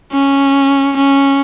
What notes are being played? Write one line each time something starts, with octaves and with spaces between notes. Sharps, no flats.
C#4
C#4